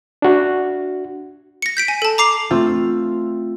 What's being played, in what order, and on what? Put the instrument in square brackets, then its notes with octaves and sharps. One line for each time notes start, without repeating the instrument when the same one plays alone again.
[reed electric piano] D4 F#4
[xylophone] A#6 C#7
G6 B6 D7
G#5
A4 A5
A#5 D6 C7 F7
[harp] A3 C4 F4